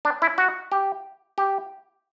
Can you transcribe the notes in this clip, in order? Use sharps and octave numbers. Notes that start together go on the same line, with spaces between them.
D4
E4
F#4
G4
G4